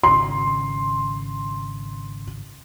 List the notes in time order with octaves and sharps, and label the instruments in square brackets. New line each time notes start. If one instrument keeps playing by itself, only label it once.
[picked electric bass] G#1 C#3 [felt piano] C6